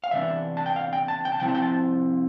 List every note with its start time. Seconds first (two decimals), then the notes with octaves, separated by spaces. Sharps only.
0.04 F5
0.11 C3 E3 B3 D4 E5
0.57 A5
0.66 G5
0.76 F5
0.93 G5
1.08 A5
1.25 G5
1.32 A5
1.40 C3 F3 C4 E4 G5
1.48 A5
1.55 G5
1.62 A5